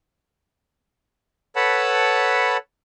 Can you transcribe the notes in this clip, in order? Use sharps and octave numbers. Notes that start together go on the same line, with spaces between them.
A4 B4 C#5 F#5 A5 B5